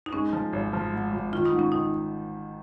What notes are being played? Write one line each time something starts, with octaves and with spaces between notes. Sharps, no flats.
D#4
G#3 C#4
F3
G#1
F3
G#2
G#1
D#3 F4
D#4
G#2
C#4
D#3 D#4